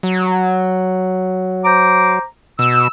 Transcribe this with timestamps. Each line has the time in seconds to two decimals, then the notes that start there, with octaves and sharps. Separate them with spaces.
0.03 F#3
1.65 C5 A#5 D6
2.59 B2 E6